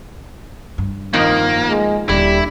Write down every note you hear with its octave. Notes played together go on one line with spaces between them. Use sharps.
G2
F2 D#3 F3 A#3
G#3
D#1 D3 F3 G3 E4